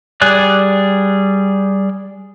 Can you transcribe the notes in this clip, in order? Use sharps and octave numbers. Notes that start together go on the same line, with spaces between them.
G3 G#4 D5 F#6